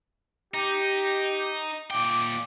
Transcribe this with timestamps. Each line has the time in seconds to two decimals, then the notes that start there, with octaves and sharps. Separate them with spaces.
0.54 D#4 G4
1.91 A#2 G5 D6